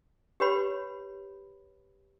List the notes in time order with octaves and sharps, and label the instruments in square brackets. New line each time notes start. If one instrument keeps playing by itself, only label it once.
[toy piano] G4 B4 C#5 B5